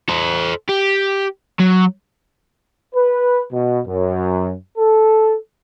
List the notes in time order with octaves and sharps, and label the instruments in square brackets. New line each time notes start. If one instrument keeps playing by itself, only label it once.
[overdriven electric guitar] A4 C5
G4
F#3
[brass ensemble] B4
B2
F#2
A4